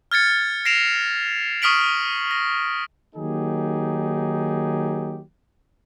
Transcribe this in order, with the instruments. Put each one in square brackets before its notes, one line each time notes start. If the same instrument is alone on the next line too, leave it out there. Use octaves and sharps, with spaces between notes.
[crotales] F6 G#6 A6 C#7
A#6 C7 D7 E7 F7
C#6 D#6 F6 B6 D7 F#7
A#6
[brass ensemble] D#3 F#3 A#3 D#4 G4 G#4